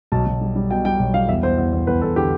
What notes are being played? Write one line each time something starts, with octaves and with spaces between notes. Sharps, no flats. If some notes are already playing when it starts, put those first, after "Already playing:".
B1 A5
B1
G3
G3
B2 G5
G3 G5
B1
G3 F5
E2 E5
E2 C5
E2
E2
E2 B4
E2 A4
D3 G4